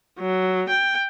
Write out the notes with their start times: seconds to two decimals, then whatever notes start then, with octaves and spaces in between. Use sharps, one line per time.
0.19 F#3
0.69 G5